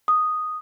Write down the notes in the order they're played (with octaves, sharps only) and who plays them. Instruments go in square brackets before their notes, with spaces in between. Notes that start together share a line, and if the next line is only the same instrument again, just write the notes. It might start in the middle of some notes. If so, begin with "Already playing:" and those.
[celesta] D#6